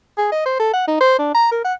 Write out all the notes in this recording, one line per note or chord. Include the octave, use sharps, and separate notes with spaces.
G#4
D#5
C5
A4
F#5
D#4
C5
D4
A#5
A#4
F#5